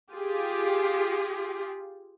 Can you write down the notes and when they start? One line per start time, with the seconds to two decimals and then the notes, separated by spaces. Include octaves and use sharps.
0.11 F4 G4 G#4